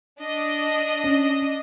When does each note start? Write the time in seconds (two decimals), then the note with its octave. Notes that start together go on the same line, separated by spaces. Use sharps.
0.21 D4 D#5
1.04 C#4